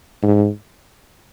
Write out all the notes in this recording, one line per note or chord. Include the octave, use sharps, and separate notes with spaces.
G#2